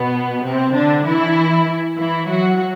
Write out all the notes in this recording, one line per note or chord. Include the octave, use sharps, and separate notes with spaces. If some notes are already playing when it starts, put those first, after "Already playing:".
Already playing: B2 B3
C3 C4
D3 D4
E3 E4
E3 E4
F#3 F#4